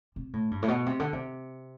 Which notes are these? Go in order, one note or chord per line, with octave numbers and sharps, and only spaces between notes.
C3
A2
G2
A2
B2
C3
D3
C3